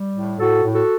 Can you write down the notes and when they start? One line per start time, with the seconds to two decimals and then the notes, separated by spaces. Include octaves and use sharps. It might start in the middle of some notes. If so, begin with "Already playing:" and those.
Already playing: G3
0.16 A2
0.39 A2 F#4 A4
0.62 A2
0.73 F#4 A4